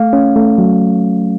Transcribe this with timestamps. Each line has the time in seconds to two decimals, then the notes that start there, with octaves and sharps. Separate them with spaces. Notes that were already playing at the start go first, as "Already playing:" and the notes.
Already playing: A3 F5
0.13 C#4
0.36 A3
0.58 F#3